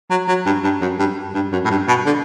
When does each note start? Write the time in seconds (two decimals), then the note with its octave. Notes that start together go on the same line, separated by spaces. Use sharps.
0.10 F#3
0.28 F#3
0.46 G2
0.64 G2
0.81 F#2
0.99 G2
1.35 G2
1.52 F#2
1.65 A2
1.70 G2
1.88 B2
2.06 D3